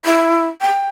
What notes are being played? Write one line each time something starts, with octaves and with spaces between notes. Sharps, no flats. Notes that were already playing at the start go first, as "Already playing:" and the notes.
E4
G5